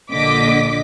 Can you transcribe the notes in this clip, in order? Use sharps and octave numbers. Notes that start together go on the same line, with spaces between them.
A#1 A#2 D3 D#5 D6 B6